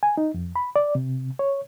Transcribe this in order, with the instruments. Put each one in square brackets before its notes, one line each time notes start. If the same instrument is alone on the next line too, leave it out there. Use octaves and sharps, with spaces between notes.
[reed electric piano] G#5
D#4
F2
B5
D5
C3
C#5